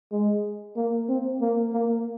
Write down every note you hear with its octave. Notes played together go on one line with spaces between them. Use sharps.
G#3
A#3
C4
A#3
A#3